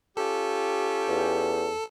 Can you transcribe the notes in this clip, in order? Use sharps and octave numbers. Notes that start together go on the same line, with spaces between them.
C#4 F4 G4 A4
E2